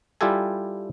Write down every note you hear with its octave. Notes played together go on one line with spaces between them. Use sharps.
G3 E4 F4 G4 A4 G#5